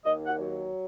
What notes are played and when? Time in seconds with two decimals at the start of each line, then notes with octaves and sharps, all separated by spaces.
0.04 D#2 D#5
0.26 F#5
0.38 F#3